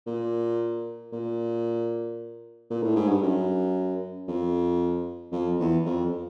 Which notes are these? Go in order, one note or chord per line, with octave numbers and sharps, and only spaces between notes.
A#2
A#2
A#2
A2
G#2
G2
F#2
F2
F2
E2
F2